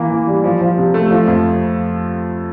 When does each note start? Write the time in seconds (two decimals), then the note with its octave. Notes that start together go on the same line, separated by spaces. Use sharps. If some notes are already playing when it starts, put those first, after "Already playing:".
Already playing: E3 A#3
0.11 E3
0.27 G3
0.44 F3
0.61 F3
0.78 C3
0.94 A3
1.11 F3
1.27 F2